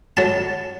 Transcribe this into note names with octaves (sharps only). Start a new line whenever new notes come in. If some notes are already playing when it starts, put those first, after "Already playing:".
F#3 A5